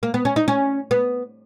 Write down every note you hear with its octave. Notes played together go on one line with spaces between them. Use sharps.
A#3
B3
C#4
D#4
C#4
B3